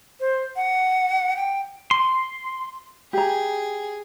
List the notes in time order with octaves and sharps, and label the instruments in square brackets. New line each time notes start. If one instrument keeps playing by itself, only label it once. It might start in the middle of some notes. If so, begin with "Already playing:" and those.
[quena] C5
F#5
G5
[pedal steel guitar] C6
[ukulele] G4 A#5 [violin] G#4